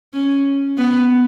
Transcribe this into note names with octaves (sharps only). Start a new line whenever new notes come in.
C#4
B3